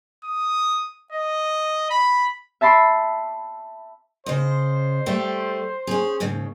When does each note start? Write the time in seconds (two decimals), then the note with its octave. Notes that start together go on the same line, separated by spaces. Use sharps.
0.25 D#6
1.13 D#5
1.90 B5
2.61 E5 A5 B5 C6 D6
4.26 C#3 C5 D#5
5.06 G3 A3 G4
5.87 C#4 G#4
6.20 D#2 G#2 C#3